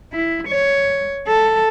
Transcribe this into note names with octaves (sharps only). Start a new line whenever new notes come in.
E4
C#5
A4